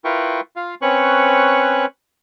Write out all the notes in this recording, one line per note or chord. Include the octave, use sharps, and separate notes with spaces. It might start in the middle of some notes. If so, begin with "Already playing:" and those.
E4 F4 A#4 B4 G5 C#6
F4 F5
C4 C#4 B4 C#5 C#6 F#6